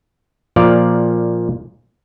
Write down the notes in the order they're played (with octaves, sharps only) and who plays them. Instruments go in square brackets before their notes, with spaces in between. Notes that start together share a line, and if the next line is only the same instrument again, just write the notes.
[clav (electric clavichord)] A#2 F3 D5 F5